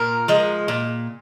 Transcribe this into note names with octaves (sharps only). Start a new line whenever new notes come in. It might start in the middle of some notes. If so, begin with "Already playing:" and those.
Already playing: A#2 A#4
F3 G#3
A#2